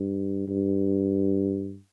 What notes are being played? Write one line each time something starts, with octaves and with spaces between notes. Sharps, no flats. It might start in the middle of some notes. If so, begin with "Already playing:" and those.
Already playing: G2
G2